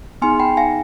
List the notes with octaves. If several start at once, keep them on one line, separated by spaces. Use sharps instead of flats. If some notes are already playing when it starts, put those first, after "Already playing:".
B3 D#4 G#4 G#5 C6
G5 B5
F5 G#5